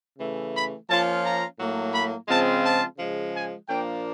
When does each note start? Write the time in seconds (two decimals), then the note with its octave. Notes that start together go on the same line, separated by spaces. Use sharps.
0.19 C#3 E3 A3
0.54 B5
0.89 F3 A#3 C#4 F4 A5
1.23 A#5
1.59 A2 F#3 A#3
1.94 B5
2.28 C#3 F3 G#3 C4 F4 A5
2.64 A5
2.98 C#3 F3 G#3
3.33 G#5
3.68 A#2 F3 A#3 D4 G5